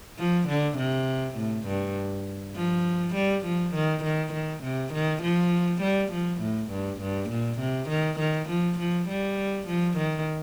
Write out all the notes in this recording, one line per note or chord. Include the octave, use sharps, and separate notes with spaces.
F3
D3
C3
A2
G2
F3
G3
F3
D#3
D#3
D#3
C3
D#3
F3
G3
F3
A2
G2
G2
A#2
C3
D#3
D#3
F3
F3
G3
F3
D#3